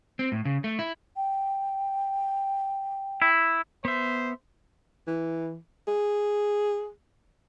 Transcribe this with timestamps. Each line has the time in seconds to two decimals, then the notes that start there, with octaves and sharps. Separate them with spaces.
0.19 C4
0.32 A2
0.45 C#3
0.64 A3
0.79 E4
1.16 G5
3.22 E4
3.85 B3 C5 E5
5.08 E3
5.88 G#4